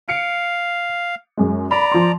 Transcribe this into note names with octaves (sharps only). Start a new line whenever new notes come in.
F5 C#7 D7
F#2 G#3
D5 A#5 B5
F3 C6